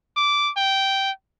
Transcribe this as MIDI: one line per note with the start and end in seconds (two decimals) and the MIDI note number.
0.17 0.52 86
0.57 1.11 79